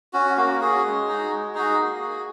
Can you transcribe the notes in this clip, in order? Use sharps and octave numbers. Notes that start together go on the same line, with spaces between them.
C#4 F#4
A#3 F#4
C#4 F#4 G#4
G#3
D#4 F#4
G#3
D#4 F#4 G#4
A#3
F#4